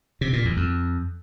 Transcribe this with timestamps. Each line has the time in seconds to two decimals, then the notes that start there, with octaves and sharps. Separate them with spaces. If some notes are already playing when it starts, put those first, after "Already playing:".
0.21 C3
0.33 A#2
0.45 E2
0.57 F2